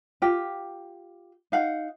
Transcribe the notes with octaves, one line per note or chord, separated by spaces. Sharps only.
F4 G4 G5
D#4 F5 F#5